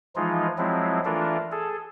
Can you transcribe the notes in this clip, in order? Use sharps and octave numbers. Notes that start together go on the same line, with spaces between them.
E3 F3 G#3 D#4 F4
F3 F#3 G#3 C4 E4
E3 A3 D4 F4 A4 A#4
G#4 A4